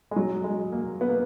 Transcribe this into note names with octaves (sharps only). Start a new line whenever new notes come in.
G#3
F#3
G#3
A#3
B3
A#3